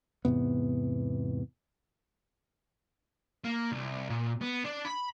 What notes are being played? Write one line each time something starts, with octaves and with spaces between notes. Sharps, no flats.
E2 G#2 C3 B3
A#3
C2
A#2
B3
D4
B5